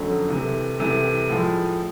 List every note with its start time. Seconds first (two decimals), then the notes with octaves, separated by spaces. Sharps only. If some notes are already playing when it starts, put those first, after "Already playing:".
Already playing: F2 D3 F#3 A3 C#4
0.28 C2 C3 E3 A3
0.79 C2 C3 E3 A3
1.29 A2 F3 G#3